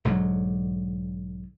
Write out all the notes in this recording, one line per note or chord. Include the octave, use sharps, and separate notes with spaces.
B1 G#2 D3 F#3